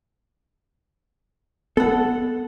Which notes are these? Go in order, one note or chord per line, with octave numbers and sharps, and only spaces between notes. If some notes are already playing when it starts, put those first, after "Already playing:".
B3 A4 F#5